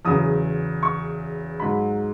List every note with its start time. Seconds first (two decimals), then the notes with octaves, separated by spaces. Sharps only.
0.05 E2 C#3 F#3 D#6
0.83 C#6
1.60 G#2 F#3 B5